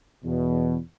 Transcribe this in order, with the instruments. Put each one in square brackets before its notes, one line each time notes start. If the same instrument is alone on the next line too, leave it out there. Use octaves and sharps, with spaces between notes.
[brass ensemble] E2 B2